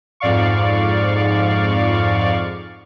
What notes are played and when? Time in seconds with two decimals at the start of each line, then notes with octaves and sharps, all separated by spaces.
0.20 F2 G#2 D5 F5 C#6